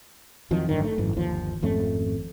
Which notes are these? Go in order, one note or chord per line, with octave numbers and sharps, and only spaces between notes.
F2 D#3 F3 F#3
G#1 F#2 D3 D#3
A3
G#1 F#2 E3
G1 D#2 F3
G#1 F2 A3 C#4